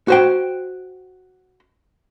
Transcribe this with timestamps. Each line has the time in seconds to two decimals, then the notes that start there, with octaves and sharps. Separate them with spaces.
0.08 F#4 C5 G5